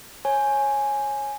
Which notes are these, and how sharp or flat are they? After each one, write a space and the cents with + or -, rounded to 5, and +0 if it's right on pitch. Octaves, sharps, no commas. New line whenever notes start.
C#5 -20 G#5 +0